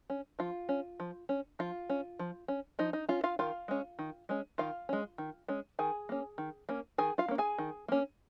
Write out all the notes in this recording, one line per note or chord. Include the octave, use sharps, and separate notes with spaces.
C#4
F3 F4
C#4
F3
C#4
F3 F4
C#4
F3
C#4
F3 D#4
D#4
C#4 F4
F4 F5
D#3 F4 F5
G#3 C#4
D#3
G#3 C#4
D#3 F4 F5
G#3 C#4
D#3
G#3 C#4
D#3 G#4 G#5
A#3 C#4
D#3
A#3 C#4
D#3 G#4 G#5
F4 F5
A#3 C#4
G#4 G#5
D#3
A#3 C#4